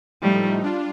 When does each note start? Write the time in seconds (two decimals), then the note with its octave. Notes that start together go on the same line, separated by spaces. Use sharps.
0.22 A2 F3 G3 A3 D#4
0.62 G3 D4 F4